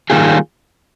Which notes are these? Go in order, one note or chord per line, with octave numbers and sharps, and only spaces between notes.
D#3 G3 A#3 F4 G#4